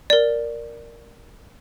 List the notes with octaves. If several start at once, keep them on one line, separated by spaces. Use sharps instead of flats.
A#4 D5